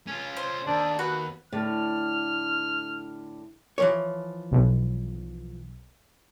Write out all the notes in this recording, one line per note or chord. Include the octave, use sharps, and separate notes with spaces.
C#4 F4
C5
D#2 D4
F#4 B4
A2 D3 F6
E3 F3 C#5
B1